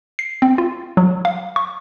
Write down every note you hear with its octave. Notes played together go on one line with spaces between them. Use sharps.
C7
C4
F4
F#3
F5
C#6